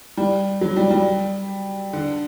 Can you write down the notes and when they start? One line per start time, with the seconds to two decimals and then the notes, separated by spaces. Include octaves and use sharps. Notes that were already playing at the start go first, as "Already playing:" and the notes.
0.17 G3
0.61 F#3
0.77 G3
0.91 G3
1.93 D3